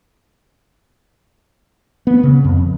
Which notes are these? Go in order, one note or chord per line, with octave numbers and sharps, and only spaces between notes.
B3
C#3
F2